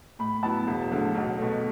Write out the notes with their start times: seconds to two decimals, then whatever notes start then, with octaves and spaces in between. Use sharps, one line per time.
0.19 A2 B5
0.43 F#3 B3 E4 A5
0.68 E1
0.91 D2 D3 F#3
1.15 B1
1.39 B2 A3